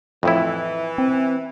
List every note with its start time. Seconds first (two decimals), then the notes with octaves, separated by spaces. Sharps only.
0.23 F2 A2 E3 E4
0.98 C4